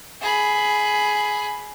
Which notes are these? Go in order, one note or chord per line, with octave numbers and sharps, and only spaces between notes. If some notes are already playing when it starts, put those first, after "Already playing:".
G#4 B5